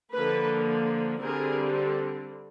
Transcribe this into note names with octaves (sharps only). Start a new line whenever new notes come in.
D3 F3 A#3 A4 B4
D3 G3 C4 G#4 A#4